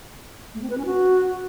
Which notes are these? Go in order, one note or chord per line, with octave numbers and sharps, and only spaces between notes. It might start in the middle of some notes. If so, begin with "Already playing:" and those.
A3
C4
B4
C#4
F#4